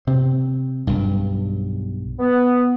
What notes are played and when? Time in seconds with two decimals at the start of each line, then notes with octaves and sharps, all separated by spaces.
0.07 C3 C4
0.87 B1 G2
2.19 B3